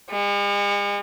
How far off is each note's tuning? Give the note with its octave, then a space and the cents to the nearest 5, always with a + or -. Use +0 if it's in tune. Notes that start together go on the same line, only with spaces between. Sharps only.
G#3 -45